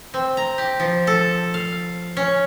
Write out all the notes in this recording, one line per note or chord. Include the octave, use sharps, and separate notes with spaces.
C4
A#5
G4
F3
A4
F5
C#4